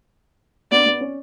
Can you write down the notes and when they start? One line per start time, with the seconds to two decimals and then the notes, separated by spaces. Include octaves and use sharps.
0.71 B3 D4 D5
0.86 B3
1.01 C#4